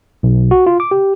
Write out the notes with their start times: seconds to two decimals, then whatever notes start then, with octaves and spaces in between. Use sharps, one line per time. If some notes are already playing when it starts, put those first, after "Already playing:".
0.23 B1
0.51 F#4
0.67 F4
0.80 D6
0.91 G4